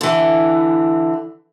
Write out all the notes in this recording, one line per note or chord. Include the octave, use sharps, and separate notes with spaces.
D3 E3